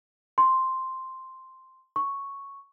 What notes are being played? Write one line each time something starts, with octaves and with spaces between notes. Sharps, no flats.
C6
C#6